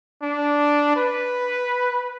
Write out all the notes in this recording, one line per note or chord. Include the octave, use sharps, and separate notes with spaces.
D4
B4